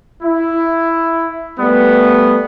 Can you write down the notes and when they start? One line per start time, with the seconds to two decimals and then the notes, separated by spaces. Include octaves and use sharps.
0.23 E4
1.59 G3 A3 B3